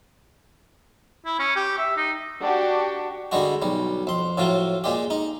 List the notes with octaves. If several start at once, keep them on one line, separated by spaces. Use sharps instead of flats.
E4
C#4
G4
E5
D#4
D4 F#4 G4
D3 G3 G#3 F#4
B1 G3
F2 C6
A2 F3 F#3 F4
A#2 G#3 G4
D#4